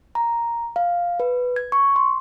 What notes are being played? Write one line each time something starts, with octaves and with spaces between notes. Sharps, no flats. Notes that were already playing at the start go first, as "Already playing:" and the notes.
A#5
F5
B4
G#6
C#6
C6